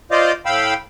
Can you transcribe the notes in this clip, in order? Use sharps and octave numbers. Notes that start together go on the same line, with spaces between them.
F4 C5 D5 D#5 F5
A2 F5 G5 B5 E6